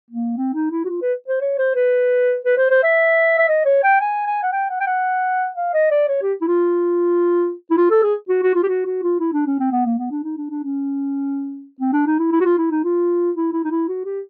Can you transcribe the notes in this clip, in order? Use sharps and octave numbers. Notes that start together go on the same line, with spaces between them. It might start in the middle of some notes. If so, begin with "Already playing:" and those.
A#3
C4
D#4
E4
F#4
F4
B4
C5
C#5
C5
B4
B4
C5
C5
E5
E5
D#5
C#5
G5
G#5
G#5
F#5
G5
F#5
G5
F#5
F5
D#5
D5
C#5
G4
E4
F4
E4
F4
A4
G#4
F#4
F#4
F4
G4
F#4
F#4
F4
E4
D4
C#4
C4
B3
A#3
B3
D4
D#4
D4
D4
C#4
C4
D4
D#4
E4
E4
F#4
F4
E4
D#4
F4
E4
E4
D#4
E4
F#4
G4